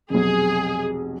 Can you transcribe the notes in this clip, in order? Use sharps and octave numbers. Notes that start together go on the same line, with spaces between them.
F1 B1 G#4